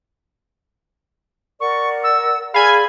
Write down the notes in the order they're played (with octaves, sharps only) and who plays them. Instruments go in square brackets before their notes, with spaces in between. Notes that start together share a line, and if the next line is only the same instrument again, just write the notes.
[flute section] A#4 D5 F#5 [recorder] C#6
[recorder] E6
[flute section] G#4 D5 [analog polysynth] F5 G#5 G#6 [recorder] B5